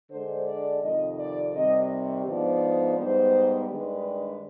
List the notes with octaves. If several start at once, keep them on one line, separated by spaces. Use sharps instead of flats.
D3 G#3 D4 C5
D5
F2 C3 D#3 D#5
D5
C3 D#3 G3 D#5
G#2 F3 B3 D4 D5
G#2 G3 B3 C5
G2 D#3 G#3 D4 B4